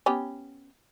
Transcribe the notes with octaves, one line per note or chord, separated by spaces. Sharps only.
B3 C#4 G4